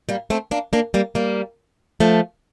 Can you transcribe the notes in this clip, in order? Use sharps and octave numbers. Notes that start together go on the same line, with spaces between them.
G3 A#3
A3 C4
A#3 D4
A#3 D4
G3 A#3
G3 A#3
F3 A3